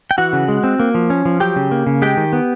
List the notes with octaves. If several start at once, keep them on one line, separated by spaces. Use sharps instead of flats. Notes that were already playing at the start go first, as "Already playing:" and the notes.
G5
E3 F#4 F#5
C#3
G#3
C4
A#3
F3
C#4
F3
F#3 G4 G5
C#3
A#3
C#3
G#3 G4 G5
D#3
B3